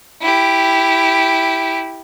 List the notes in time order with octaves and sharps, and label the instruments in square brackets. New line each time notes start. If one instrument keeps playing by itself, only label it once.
[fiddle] E4 G4